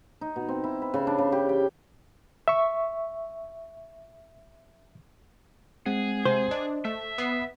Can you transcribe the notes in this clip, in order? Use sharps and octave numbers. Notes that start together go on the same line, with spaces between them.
D#4
B2
C4
E4
B4
C#3
D4
C#3
G4
G5
E5 C#6
G#3 C4 G#4 F#5
C3 C5
D4 D#5
A3 E5
B3 D#6 C7